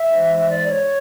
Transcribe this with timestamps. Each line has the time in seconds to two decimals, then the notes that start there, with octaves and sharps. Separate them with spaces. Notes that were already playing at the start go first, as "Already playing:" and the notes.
Already playing: E5
0.10 G#2 E3 G#3
0.49 D5
0.68 C#5